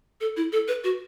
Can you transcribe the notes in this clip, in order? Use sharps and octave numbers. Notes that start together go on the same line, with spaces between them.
A4
E4
A4
B4
F#4